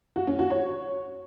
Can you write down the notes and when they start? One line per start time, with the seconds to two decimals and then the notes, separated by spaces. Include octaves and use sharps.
0.16 F#4
0.27 C#4
0.39 F#4
0.50 C#5